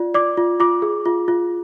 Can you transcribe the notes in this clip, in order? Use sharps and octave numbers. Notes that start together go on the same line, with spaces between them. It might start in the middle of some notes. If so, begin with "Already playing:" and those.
Already playing: F4 D5
D5 D6
F4
F4 D6
G#4
F4
F4